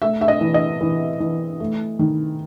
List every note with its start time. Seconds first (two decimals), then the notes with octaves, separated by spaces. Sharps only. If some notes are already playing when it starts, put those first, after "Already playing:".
0.02 A3 E5
0.21 E5
0.28 D#5
0.41 E3
0.54 D#5
0.81 E3
1.20 E3
1.60 A3
1.99 D#3